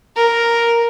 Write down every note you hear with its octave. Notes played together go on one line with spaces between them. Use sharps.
A#4